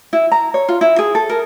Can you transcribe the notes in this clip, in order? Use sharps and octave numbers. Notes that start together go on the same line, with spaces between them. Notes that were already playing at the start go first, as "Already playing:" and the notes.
E4
A#5
C#5
F4
E4
G#4
A4
A#4